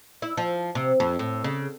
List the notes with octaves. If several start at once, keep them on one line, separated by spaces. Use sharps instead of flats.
E4
F3
C3
F2
A2
C#3